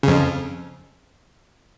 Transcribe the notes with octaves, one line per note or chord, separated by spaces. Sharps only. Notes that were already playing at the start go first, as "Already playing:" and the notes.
F2 C#3